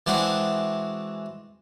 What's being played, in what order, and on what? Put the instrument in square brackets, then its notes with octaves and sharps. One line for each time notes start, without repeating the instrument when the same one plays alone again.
[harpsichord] E3 G#3 C4 D4 F#4